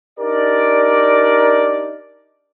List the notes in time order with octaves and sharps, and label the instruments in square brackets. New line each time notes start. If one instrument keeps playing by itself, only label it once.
[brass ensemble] D4 D#4 G4 A#4 D5